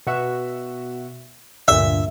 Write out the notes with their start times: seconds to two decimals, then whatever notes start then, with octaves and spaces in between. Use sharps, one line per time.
0.07 B2 F#4 E5
1.68 D2 G2 A#2 E5